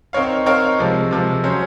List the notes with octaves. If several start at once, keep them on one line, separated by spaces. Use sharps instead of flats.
C4 D#4 A#4 C#5 F5
C4 D#4 A#4 C#5 F5
C3 F3 G#3
C3 F3 G#3
F#3 C#4 G#4 C5